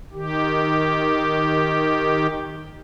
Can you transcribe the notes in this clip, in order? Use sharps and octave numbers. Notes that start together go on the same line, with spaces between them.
D#3 G4